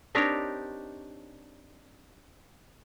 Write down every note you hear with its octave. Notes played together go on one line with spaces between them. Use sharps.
C4 D4 D#4 G4 A#4 C#5